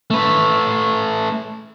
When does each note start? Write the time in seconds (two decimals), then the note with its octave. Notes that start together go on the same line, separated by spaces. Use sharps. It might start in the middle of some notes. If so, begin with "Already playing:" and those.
0.10 A3 B4